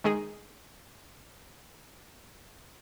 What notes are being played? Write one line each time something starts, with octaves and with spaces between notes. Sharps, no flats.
D#3 G#3 D#4 G#4